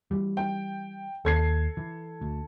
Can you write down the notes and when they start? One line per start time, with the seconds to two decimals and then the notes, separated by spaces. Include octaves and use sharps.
0.11 E3 G3
0.37 G5
1.25 D#2 A4 G#6 C7
1.77 E3
2.22 D2